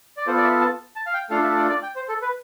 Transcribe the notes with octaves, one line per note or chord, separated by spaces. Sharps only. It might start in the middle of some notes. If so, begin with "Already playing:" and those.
D5
B3 F4 A4 C5
D5
E5
A5
A5
F5
G5
A3 D4 F4 A4 F5
E5
D5
D5
G5
C5
A4
B4